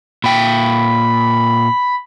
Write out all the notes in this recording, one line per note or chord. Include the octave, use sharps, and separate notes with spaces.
A#2 G5 B5